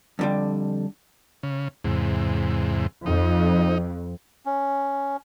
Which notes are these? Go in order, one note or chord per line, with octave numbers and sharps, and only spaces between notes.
F2 D3 G3
C#3
E2 G#2 C3
F2 D#4
C#4